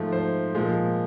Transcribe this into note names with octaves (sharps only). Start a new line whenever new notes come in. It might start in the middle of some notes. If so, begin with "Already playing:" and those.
Already playing: G#2 F3 A3
C5
A#2 F3 G#3